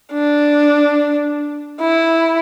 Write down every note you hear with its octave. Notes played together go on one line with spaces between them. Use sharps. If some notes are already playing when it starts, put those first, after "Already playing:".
D4
E4